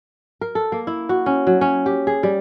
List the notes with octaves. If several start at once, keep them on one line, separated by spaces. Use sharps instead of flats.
A#4
A4
A#3
E4
F#4
C#4
F#3
C#4
G4
G#4
G3